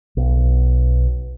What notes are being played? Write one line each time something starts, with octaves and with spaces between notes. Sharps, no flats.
B1